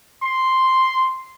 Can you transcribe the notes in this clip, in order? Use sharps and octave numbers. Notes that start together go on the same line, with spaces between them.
C6